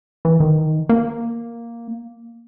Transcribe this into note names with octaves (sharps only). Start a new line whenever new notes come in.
E3
D#3
A#3